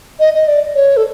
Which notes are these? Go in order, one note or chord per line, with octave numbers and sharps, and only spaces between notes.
D#5
D#5
D5
C#5
A4